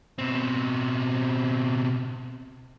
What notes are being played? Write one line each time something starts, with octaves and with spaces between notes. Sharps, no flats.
B2 C4